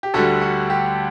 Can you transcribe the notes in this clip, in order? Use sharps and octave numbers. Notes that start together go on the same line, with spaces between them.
G4
D2 D3 G3 F#4 A4
F#4
G4